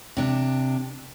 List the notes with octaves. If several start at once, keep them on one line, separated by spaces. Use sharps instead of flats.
C3 D4